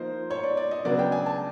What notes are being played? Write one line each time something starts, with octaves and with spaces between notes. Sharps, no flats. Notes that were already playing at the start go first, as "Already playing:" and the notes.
Already playing: F3 A#3 D#4 C5
C#5
D5
D5
D#5
C#3 F#3 B3 D4 D5
G5
G#5
A5